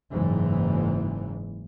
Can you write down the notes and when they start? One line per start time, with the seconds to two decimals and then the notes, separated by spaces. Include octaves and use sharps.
0.11 F#1 G#2 E3